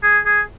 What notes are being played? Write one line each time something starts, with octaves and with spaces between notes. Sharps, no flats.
G#4
G#4